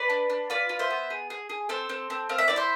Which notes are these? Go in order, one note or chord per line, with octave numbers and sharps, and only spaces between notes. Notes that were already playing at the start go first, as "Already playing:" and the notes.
Already playing: B4 D5
D4
D4
F4 B4 D5
F4
C5 E5
B3
G#4
G#4
G#4
C4 A4 C5
C4
C4
C4 F5
E5
E4 D5
C5 E5